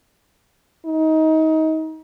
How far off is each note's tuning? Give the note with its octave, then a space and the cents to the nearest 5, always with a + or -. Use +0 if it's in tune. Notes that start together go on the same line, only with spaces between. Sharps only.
D#4 +25